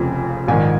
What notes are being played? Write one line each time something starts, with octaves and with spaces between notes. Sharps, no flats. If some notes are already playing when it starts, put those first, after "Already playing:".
Already playing: F1 F2 C#3 F3 G#5
A#1 G#2 D#3 G#5